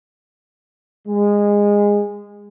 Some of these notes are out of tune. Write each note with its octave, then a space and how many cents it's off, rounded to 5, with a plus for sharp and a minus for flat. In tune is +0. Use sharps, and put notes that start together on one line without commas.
G#3 -20